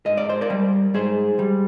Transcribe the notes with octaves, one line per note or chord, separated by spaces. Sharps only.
G#2 D#5
D5
C5
A#4 D5
G3
G#2 G#4 C5
G3